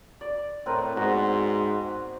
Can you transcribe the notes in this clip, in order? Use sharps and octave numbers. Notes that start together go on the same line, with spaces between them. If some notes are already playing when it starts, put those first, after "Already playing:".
D5
A2 C4 A#4 B4
G#2 B3 C4 F#4